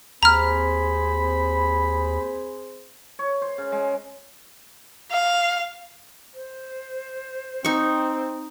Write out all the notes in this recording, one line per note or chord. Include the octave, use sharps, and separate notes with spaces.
D#2 C4 G#4 C5 A#5 B5 F6
C#5
C5
C#3
G#3
F5
C5
C4 D#4 C#6